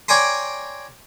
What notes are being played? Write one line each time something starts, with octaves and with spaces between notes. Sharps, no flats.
C#5 D5 G5 G#5 A#5 C6